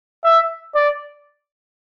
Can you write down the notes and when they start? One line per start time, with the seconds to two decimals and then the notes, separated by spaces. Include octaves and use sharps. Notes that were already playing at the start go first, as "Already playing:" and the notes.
0.24 E5
0.75 D5